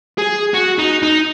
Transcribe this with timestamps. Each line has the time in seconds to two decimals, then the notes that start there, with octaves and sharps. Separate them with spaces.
0.18 G#4
0.54 F#4
0.79 D#4
1.02 D#4